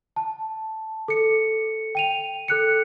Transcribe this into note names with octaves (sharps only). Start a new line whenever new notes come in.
A5
A4 C#7
G5 D#7 F7
A4 F#6 C#7